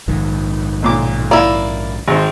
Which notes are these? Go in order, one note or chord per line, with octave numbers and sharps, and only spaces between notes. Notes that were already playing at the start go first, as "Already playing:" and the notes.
A#1 G#2 D#3
B1 A#2 D6
A#3 E4 D5
G#1 C5